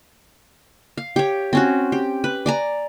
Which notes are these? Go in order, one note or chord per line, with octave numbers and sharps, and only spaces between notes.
F5
G4 C#5
C4 C#4 F#4
G4
B4
D5 G#5 A#5